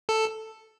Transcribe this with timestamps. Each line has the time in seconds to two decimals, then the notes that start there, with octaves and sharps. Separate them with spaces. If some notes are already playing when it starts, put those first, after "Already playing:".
0.09 A4